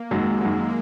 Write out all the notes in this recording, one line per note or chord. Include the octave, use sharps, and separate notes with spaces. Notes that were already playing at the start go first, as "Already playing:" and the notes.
Already playing: A#3
F#2 D#3 F#3 G#3
F#2 D#3 F#3